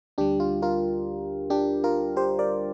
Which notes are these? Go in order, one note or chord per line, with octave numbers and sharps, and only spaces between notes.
D2 D3 G3 D4 G4
F4
F4 A#4
D4 G4
F4 A#4
G4 C5
A#4 D5